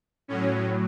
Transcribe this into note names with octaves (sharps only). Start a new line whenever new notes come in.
A2 F#3 C#4